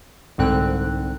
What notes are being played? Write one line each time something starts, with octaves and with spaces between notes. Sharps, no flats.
C2 G#2 D3 C4 F#6